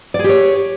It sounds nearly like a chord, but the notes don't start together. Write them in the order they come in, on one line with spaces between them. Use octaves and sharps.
D5 G#4 G4 C#5